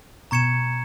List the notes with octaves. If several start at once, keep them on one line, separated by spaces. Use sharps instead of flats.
B2 A#5 C#6 G#6 C#7 E7